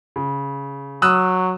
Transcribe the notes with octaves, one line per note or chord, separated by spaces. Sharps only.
C#3
F#3 D#6 E6 F#6